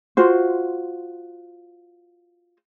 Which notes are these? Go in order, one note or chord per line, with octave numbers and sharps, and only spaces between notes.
F4 F#4 C5